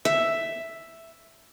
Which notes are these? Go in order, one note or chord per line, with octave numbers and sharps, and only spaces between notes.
E5